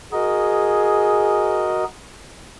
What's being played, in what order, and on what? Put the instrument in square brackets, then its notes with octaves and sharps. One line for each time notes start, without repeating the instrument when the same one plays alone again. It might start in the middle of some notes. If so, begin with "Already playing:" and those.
[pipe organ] F#4 A#4 D#5 [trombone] G#4